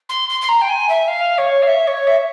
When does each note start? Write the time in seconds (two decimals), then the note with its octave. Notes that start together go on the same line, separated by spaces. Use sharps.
0.09 C6
0.29 C6
0.42 C6
0.49 A#5
0.61 G5
0.69 G#5
0.89 E5
1.08 F5
1.38 C#5
1.63 F5
1.67 E5
1.87 C#5
2.07 E5